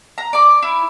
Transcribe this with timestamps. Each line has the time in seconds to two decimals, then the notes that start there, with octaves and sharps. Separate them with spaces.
0.18 A#5
0.33 D5 D6
0.62 E4